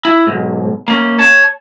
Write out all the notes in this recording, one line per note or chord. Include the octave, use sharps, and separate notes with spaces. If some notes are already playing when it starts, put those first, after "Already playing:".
E4
B1 G#2
A#3 C#4
C#5 A5